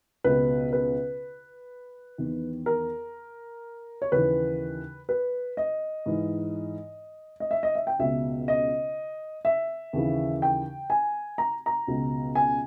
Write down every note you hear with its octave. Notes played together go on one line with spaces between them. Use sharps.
C#2 B2 B4
B4
E2 D#3
A#4
C#5
D#2 C#3 E3 B4
B4
D#5
G#2 E3
D#5
E5
D#5
E5
G5
C#2 B2 E5
D#5
E5
D#2 C#3 E3
G5
G#5
A#5
A#5
C#2 B2
G#5